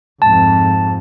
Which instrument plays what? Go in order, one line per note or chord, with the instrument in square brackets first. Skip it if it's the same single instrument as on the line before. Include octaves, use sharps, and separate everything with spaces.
[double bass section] F2 G#2 [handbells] A5